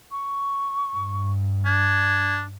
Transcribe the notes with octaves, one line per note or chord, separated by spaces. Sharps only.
C#6
G2
D4 G#6